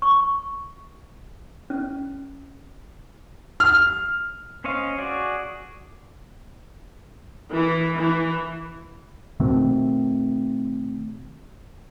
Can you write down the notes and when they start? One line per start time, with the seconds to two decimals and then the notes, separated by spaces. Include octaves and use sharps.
0.02 C#6
1.70 C#4
3.60 F6
4.64 C#4 C5 C#5 D#5 F5
4.98 F#4 G#4 D5
7.52 E3
7.96 E3
9.40 B2 D#3 A3 C4